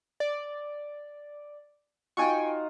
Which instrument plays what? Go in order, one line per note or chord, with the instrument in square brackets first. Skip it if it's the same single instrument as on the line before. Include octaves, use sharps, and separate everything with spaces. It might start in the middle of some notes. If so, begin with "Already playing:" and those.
[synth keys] D5
[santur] D#4 F4 F#4 [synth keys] G5 G#5 C#6